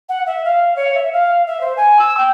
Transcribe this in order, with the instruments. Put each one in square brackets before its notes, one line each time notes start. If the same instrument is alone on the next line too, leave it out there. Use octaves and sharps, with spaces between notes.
[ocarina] F#5
E5
F5
C#5
E5
F5
E5
C5
G#5
E6
G5